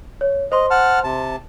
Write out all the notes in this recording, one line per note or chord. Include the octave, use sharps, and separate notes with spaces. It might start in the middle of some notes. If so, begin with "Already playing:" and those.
C#5
C5 D#5 C6
F#5 A5 F6
C3 A5